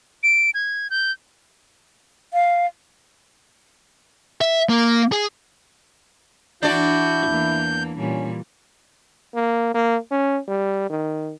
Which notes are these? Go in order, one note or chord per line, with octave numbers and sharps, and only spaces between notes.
D7
G#6
G6
F5
E5
A#3
G#4
E3 D4 E4 F#4 D5 G6
E2 E3 A#3
A#2 E3 G3 C#4
A#3
A#3
C#4
G3
D#3